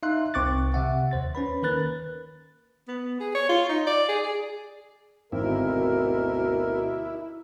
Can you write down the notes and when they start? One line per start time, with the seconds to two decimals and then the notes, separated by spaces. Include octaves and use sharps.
0.03 D#4 E5 F5 C6 F#6
0.34 C2 C4 C#6 D6 F#6 A6
0.74 C3 E5 F#5
1.11 D#2 C5 A6
1.35 C#4 B4 B5
1.63 D#3 A#3 A#4 B4 F#6 A6
2.87 B3
3.20 G#4
3.35 C#5
3.49 F4
3.69 D#4
3.87 D5
4.08 G#4
4.24 G#4
5.32 G#1 D2 B2 E4 A#4